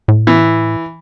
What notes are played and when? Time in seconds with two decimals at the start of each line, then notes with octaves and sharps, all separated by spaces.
0.08 A2
0.27 E3